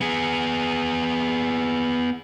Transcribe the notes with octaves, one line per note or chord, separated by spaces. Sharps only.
B3 G#4